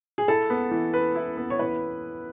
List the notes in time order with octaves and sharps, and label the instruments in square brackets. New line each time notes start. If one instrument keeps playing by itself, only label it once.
[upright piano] G#4
[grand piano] E4 [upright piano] A4
[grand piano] B3
E3
B4
E4
B3
[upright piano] C#5
[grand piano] E3 [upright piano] B4